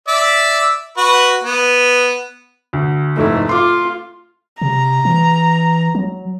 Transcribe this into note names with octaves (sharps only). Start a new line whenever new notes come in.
D5 E5
F#4 B4
B3
D2
F1 G#2 A3 E4
F4 C6 D6
C3 A#5
E3
F#3